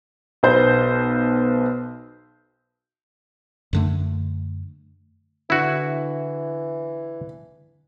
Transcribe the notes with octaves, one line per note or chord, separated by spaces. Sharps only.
B1 B3 C5 G6
F#2 D3 A3
D3 E3 E4 F#4